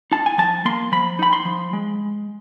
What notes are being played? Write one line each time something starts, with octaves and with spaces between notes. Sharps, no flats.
D#4 A5
G#5
F3 A5
A#3 C6
F3 B5
D#4 B5
C6
F3
G#3